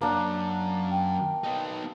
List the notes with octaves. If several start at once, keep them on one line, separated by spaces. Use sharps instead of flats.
F#2 F#3 A#3 D4
G5
B3 D#4